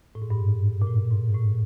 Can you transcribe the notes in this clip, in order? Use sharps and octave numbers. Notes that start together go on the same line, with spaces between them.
A2
G#2
G2
G#2
A#2
A2
G#2
G#2
A2